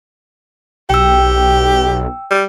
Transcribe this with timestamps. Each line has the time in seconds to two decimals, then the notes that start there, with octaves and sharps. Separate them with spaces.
0.90 B1 G4 G5 E6
2.31 G3